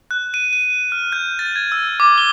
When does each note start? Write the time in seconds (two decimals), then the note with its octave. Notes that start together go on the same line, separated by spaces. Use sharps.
0.11 F#6
0.34 D#7
0.53 D#7
0.92 F6
1.12 G6
1.39 A6
1.56 G#6
1.72 E6
2.00 D6
2.18 G7